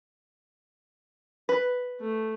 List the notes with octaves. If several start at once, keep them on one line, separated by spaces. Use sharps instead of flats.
B4
A3